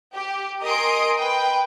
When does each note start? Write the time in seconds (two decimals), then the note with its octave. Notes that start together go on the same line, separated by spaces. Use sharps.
0.14 G4
0.62 A#4 D#5 G#5 C6 D#6 D7
1.18 B4 G5